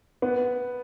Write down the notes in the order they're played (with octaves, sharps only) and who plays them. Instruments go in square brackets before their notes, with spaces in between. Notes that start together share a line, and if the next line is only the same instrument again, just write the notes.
[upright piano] B3